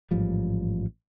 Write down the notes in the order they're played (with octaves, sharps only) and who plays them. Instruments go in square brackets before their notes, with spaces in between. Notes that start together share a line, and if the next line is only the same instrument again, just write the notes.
[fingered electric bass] A1 G#2 F3 G3